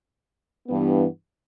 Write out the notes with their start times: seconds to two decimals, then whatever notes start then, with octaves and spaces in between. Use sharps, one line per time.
0.68 G2 E3 B3